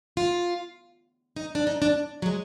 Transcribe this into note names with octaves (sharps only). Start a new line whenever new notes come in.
F4
D#4
D4
D#4
D4
F#3
G#3